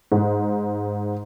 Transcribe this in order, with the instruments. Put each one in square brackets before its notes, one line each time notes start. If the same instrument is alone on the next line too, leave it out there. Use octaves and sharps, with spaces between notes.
[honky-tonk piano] G#2